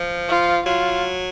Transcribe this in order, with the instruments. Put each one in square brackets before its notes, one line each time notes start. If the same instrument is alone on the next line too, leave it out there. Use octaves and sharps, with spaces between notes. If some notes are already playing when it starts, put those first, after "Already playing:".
Already playing: [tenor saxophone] F3
[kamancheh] F4
[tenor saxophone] F#3 [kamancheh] F4